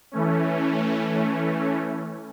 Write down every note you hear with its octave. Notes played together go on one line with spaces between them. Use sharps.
E3 A3 C#4